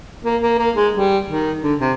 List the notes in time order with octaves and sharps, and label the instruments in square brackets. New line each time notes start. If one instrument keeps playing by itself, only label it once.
[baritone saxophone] A#3
A#3
A#3
G#3
G3
D#3
D3
C3